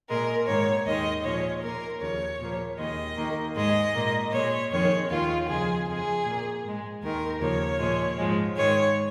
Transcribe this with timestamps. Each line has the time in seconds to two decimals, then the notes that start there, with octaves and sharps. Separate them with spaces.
0.09 A#2 G#3 A#4
0.47 G#2 D#3 A#3 C#5
0.86 D#2 D#3 G#3 D#5
1.25 A#2 F3 G#3 C#5
1.63 A#2 A#3 A#4
2.01 D#2 C#3 F3 C#5
2.40 A#2 F3 A#3
2.78 D#2 D#3 G#3 D#5
3.17 D#2 D#3 A#3
3.56 G#2 G#3 D#5
3.95 A#2 A#3
4.33 A#2 G#3 C#5
4.71 F2 D#3 G#3 C#5
5.10 D#2 D#3 G#3 F4
5.48 F2 C#3 F3 G#3 G#4
5.87 F2 F3 G#3 G#4
6.25 A#2 A#3
6.64 G#2 G#3
7.03 D#2 D#3 G#3 A#4
7.41 D#2 C#3 F3 A#3 C#5
7.80 A#2 F3 G#3
8.18 G#2 F3 G#3
8.57 G#2 D#3 G#3 C#5